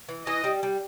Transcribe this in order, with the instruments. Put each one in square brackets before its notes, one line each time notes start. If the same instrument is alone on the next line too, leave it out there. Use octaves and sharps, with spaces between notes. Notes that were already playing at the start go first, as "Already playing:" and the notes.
[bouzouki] E3
[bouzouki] E3 [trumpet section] D#5
[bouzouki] G3
G3